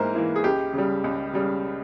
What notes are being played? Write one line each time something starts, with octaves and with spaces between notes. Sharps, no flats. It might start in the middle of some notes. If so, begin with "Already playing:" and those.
Already playing: G#2 E3 A#3 A#4 C5
E3 A#3 E4
G#4
C#2 G4
C#3 G3
C#2
C#3 G3